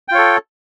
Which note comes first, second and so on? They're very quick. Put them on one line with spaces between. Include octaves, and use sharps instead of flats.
G5 F4 C#5 A4